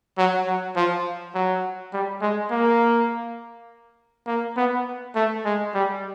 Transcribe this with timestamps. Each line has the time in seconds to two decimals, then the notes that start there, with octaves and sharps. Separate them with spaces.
0.17 F#3
0.46 F#3
0.76 F3
1.34 F#3
1.93 G3
2.21 G#3
2.51 A#3
4.27 A#3
4.56 B3
5.15 A3
5.45 G#3
5.74 G3